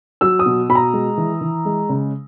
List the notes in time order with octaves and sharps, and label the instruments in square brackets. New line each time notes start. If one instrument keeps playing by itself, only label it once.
[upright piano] F#3 E6
D#6
B2
B2 B5
A#5
G#3
E3
E3
G#3
C#3